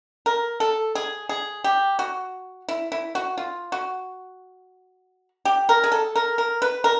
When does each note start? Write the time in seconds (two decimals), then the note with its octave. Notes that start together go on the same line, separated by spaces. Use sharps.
0.26 A#4
0.60 A4
0.95 G#4
1.29 G#4
1.64 G4
1.99 F#4
2.69 E4
2.92 E4
3.15 F#4
3.38 F4
3.72 F#4
5.45 G4
5.69 A#4
5.84 G#4
5.92 A4
6.16 A#4
6.38 A#4
6.62 B4
6.84 A#4